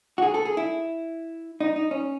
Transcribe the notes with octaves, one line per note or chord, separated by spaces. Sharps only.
F#4
G#4
A4
G#4
E4
D#4
D#4
C#4